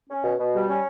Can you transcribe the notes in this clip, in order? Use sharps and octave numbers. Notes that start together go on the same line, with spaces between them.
C#4
B2
B2
G3
C#4